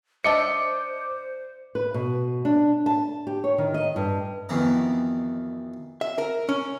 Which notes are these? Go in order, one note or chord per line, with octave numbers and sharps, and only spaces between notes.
D4 C5 D#5 E5 D6 C#7
B4
B2
D4
A5
G4
C#5
D#3
D#5
G2
F2 B2 D#3 E3 A#5
E5
A#4
C#4